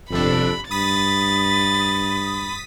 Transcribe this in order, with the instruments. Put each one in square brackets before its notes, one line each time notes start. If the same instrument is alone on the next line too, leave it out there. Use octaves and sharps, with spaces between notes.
[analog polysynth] G1 C3 D4 [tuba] F2 [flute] A4 [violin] B5
[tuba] G2 [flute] B5 [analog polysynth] D#6 B6 [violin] A6